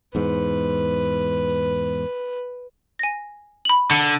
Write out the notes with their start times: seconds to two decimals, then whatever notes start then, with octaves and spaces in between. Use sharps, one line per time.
0.15 E2 G#2 B4
2.99 G#5 A#6
3.65 B5 F#7
3.91 D3 C#7